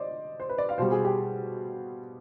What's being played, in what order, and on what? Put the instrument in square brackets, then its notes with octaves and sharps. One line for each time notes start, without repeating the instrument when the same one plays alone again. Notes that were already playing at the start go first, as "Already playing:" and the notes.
Already playing: [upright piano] C5 D5 D#5
C5
B4
D5
F5
B2 G3 C5
G#4
G4